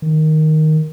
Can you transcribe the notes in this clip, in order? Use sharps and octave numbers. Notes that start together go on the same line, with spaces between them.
D#3